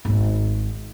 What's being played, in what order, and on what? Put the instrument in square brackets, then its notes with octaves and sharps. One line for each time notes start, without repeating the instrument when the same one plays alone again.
[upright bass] G#1 C#4